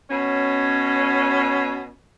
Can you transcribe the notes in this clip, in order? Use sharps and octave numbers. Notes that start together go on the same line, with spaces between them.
B2 C#4